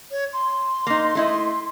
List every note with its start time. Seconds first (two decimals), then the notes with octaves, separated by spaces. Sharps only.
0.11 C#5
0.33 C6
0.87 A#3 D#4
1.15 A3 E4 D#5